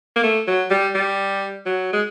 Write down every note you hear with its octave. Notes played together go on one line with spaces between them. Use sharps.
A#3
A3
F#3
G3
G3
F#3
G#3